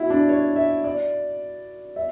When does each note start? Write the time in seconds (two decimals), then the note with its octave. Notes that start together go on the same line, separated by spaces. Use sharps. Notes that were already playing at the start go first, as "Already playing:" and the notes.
Already playing: E4 F#4
0.10 D4
0.29 C#5
0.56 E5
0.84 D5
1.96 E5